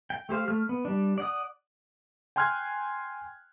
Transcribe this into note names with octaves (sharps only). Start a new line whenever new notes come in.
G5
A3 G4 C5 F5
A3 F6
B3
G3 D4
D5 F#5 D#6
G5 G#5 C6 F6 F#6 G#6